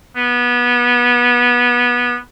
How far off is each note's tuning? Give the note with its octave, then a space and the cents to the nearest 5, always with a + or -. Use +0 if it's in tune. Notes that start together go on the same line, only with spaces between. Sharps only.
B3 -20